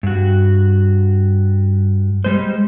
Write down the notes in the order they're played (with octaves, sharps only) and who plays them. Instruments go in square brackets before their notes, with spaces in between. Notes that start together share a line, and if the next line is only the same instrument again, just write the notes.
[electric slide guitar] G2 F#4
G3 G#3 C5